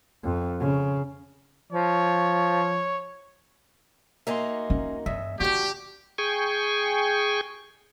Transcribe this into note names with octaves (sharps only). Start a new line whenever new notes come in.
F2
C#3
F3 C#5
A#3 D#4 F#4 E5 G#5 C6
C#4
E2 G2 D#5 E5
D3 F3 A#3 F#4 G4
G#4 G5 G#5 C#6